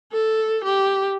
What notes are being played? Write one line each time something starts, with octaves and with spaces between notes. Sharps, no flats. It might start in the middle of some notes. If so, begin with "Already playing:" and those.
A4
G4